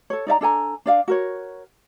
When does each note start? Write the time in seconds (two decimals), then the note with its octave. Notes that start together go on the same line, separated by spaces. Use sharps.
0.10 A4 C#5
0.27 D#4 D5 E5 A#5
0.41 D4 A4 G#5 A#5
0.86 D4 D5 F5
1.08 F#4 A#4 C#5